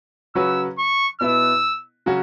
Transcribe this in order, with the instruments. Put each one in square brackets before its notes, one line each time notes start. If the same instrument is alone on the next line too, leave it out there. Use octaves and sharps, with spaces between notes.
[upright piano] C#3 F#3 C#4 F#4 B4 [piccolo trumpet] E6
[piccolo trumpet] C#6
[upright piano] B2 B3 E4 B4 [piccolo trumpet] E6
[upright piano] C#3 F#3 C#4 F#4